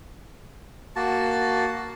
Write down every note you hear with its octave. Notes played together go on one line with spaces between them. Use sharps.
A#3 F#4 A5